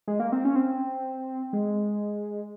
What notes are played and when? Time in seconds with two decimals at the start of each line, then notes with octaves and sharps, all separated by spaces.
0.08 G#3
0.20 A#3
0.32 C4
0.45 C#4
0.56 C4
1.53 G#3